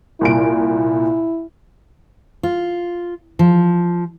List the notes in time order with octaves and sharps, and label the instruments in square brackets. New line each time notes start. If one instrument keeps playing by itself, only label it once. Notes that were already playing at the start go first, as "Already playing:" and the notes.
[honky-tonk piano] C2 A#2 D7 [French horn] E4
[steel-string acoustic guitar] F4
F3